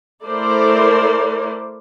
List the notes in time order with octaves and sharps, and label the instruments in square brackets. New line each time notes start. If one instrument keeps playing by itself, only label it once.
[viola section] A3 E4 A#4 C5 D5